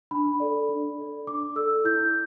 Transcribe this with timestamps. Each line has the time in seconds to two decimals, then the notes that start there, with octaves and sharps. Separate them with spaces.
0.11 D4 B5
0.40 A4 D5
0.69 D4
0.98 A4 D5
1.27 D4 D6
1.56 A4 D5 E6
1.84 E4 G6